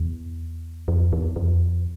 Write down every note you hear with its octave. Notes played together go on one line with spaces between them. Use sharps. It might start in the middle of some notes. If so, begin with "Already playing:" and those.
Already playing: E2
F2
E2
F2